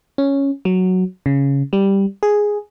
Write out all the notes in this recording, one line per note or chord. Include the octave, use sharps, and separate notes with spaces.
C#4
F#3
C#3
G3
G#4